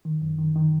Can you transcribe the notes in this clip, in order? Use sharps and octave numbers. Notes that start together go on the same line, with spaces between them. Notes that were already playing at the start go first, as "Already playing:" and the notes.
D#3
F#2
D#3
D#3